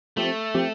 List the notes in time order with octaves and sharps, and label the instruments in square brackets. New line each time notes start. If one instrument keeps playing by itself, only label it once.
[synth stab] F3 C4 G4 [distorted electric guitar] A3
[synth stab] F3 C4 G4